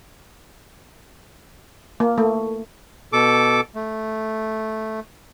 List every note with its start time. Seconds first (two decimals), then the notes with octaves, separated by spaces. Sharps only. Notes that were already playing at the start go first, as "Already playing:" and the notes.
2.00 A#3
2.18 A3
3.13 B2 A4 D6
3.75 A3